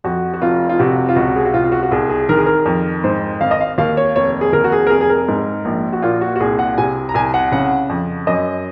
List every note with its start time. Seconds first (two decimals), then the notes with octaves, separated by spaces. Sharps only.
0.04 F2 F#4
0.34 F#4
0.42 F1 F4
0.69 F4
0.79 C3 F#4
1.09 F4
1.16 C#2 F#4
1.36 G#4
1.45 F#4
1.54 C3 F4
1.64 F4
1.72 F#4
1.83 F#4
1.91 C2 G#4
2.10 G#4
2.29 D#3 A#4
2.38 G#4
2.46 A#4
2.65 F2
3.04 G#2 C5
3.41 G#1 F5
3.51 D#5
3.61 F5
3.78 D#2 F5
3.97 C#5
4.16 F1 C#5
4.41 G#4
4.52 D#2 A#4
4.64 F#4
4.72 G#4
4.87 A#4
4.90 F1 G#4
5.01 G#4
5.09 A#4
5.28 G#2
5.65 A#1
5.93 F#4
6.02 A#2 F4
6.21 F#4
6.36 F#4
6.40 C2 G#4
6.59 F#5
6.78 C3 G#5
7.09 A#5
7.14 C2 G#5
7.34 F#5
7.52 C#3 F#5
7.89 F2
8.27 F#2 D#5